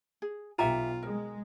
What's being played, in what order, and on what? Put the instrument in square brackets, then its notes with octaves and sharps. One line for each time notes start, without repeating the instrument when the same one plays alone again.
[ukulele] G#4
[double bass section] B1 [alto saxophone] F4 [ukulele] G4 E5 G#5 [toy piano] G5 A#5
[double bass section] G#3 [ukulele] A#4